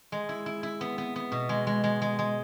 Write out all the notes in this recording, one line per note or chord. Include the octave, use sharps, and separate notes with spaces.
G#3
E4
E4
E4
B3
B3
B3
B2
G#3
G#3
G#3
G#3
G#3